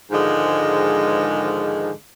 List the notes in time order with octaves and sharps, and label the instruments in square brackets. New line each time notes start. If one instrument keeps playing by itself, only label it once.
[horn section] G#2 D3 D#3 F3 G#3